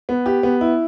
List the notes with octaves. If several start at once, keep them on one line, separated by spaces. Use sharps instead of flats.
B3
G4
B3
E4